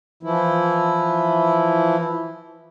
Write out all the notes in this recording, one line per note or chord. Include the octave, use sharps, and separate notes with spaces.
E3 F3 E4